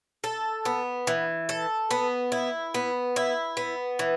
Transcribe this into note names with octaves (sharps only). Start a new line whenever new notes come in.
A4
B3
E3
A4
B3
E4
B3
E4
B3
E3